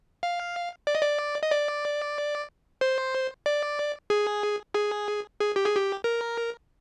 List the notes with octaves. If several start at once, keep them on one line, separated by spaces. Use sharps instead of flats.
F5
D5
D#5
D5
D#5
D5
C5
D5
G#4
G#4
G#4
G4
G#4
G4
A#4